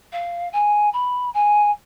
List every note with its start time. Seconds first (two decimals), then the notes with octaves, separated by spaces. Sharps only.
0.12 F5
0.53 G#5
0.93 B5
1.34 G#5